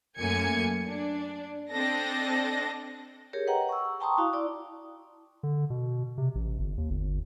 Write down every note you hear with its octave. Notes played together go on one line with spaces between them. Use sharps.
F#2 A3 A#3 G#5 G#6 C#7
D4
C4 D4 A4 D#5 A#6
G4 G#4 A#4 C#5
B4 D#5 F#5 G5 A#5
C#6 E6
G5 A5 A#5 C6 C#6 D#6
E4 F#4 F5 D#6
E4 D5 D6
D3
B2
C3
A1
G1
D#2
G1